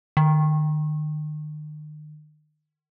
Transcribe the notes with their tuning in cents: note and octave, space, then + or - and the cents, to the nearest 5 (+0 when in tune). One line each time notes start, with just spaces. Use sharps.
D#3 -40